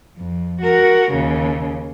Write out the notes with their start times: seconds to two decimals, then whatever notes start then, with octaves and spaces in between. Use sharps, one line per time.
0.17 F2
0.61 F#4 A#4
1.11 D#2 C#3